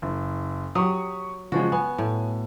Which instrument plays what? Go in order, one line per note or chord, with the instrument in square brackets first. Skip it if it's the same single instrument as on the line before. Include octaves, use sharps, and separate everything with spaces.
[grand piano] F#1
[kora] F#3 [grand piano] G4 C#6 D#6
[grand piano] C#3 F3 G#3 [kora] F#4
[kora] B3 [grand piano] G#5
[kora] A2